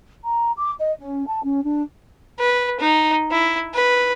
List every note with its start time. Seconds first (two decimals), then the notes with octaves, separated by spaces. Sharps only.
0.23 A#5
0.57 D6
0.79 D#5
1.00 C#4
1.26 A5
1.43 C#4
1.63 D4
2.40 B4
2.80 D#4
3.31 E4
3.74 B4